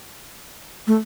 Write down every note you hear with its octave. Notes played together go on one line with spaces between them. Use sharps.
A3